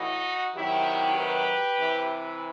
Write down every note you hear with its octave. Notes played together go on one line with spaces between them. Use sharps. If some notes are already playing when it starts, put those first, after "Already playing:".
Already playing: A2 E3 D#4 F#4
C3 D#3 F#3 E4 G4
G4 B4
C3 E3